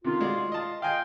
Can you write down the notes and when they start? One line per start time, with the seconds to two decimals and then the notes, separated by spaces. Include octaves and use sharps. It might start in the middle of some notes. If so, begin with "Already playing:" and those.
0.04 C3 D#3 F4
0.21 G#3 F#4 D5
0.52 F4 D#5 A5
0.82 F4 D#5 F5 G5 G#5